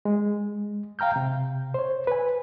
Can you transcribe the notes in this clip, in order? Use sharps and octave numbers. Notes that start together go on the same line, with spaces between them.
G#3
F5 G5 A#5 F6 G6
C3
C5 C#5
B4 G#5